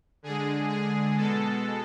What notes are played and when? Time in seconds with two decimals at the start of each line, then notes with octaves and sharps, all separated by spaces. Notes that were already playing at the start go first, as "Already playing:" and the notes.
0.23 D3 G#3 G#4
0.69 G#4
1.16 B2 G#3 A4